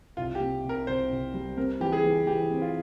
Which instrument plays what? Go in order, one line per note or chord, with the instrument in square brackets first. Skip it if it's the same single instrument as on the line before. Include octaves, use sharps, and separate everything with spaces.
[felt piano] C2 [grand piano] F4
[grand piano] G4
[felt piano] C3
C3
[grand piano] A#4
[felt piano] C2 [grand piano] C5
[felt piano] C2
G3
[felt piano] C4 [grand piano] A#4
[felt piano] E3 [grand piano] G4
[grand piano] G#4
[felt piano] E3
[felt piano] E3 [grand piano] G4
[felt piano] C4
[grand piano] F4